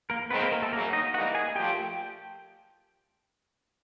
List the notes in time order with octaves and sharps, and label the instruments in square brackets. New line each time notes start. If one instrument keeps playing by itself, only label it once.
[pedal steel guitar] A#3 A#4
[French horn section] D#3 G#3 C4 [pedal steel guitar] B3 B4
[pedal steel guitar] A#3 A#4
A#3 A#4
A3 A4
[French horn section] F#2 C#3 F#3 [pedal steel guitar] A#3 A#4
[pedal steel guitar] D#4 D#5
[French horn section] G#2 E3 G3 A#3 D#4 [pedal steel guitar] F#4 F#5
[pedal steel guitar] G#4 G#5
[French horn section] A#2 F3 A3 [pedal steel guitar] G4 G5